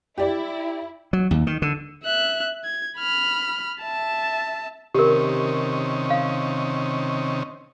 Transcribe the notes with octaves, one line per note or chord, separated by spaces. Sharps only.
E4 G4 D5
F#3
D#2
D#3
D3
E5 F#6
G#6
B5 F6
E5 A5
C3 D#3 C#4 G4 A#4
F5